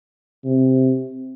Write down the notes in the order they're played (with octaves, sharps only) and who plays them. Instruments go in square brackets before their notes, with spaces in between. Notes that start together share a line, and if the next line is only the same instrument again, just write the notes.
[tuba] C3